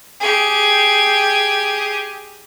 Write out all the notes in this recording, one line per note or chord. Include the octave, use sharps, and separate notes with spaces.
G4 G#4